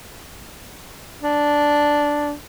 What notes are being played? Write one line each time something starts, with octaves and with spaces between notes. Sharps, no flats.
D4